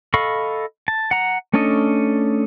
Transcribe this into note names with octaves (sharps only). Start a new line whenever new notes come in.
A4 D#5 F5 B5 C#6
A5
F#5 A#5
A3 C#4 D4 A4 D#5